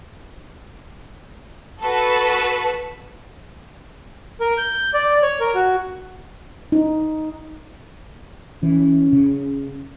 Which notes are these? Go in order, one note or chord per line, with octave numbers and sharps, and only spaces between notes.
F#4 A4 B4 A5
A#4
G6
D5
C#5
A#4
F#4
D#4
E3 C#4
C#3